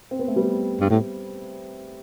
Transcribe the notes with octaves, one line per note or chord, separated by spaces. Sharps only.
C4
B3
A3
G3 B3
G2
A2